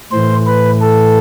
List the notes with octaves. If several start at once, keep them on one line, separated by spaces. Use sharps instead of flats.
A2 E3 C5
B4
A4